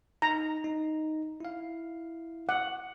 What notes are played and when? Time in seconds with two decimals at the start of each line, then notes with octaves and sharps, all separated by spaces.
0.22 D#4 A#5
0.64 D#4
1.40 E4 F5
2.49 F#5